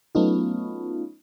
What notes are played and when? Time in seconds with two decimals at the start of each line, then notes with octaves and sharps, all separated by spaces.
0.15 F#3 A3 B3 C#4 D#4 F4